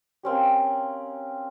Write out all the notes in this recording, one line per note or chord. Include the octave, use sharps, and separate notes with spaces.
A#3 C4 C#4 G4